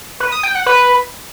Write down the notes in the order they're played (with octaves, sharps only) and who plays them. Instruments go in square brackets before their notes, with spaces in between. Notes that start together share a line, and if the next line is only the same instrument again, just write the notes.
[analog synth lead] B4
D#6
G5
F#5
B4